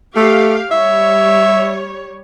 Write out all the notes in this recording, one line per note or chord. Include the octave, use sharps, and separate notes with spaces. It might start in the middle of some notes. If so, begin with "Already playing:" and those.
A3 G4 F5
G3 C#5 E5